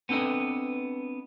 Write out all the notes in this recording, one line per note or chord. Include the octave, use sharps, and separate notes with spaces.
B3 C4 D4 A4 B4 D#5